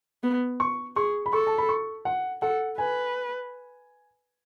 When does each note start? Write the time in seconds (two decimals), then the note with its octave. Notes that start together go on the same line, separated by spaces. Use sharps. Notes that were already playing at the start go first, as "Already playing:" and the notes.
0.24 B3
0.60 C#6
0.96 G#4 C#6
1.26 B5
1.33 A4 C#6
1.47 A5
1.58 B5
1.69 C#6
2.05 F#5
2.42 A4 F#5
2.78 B4 G#5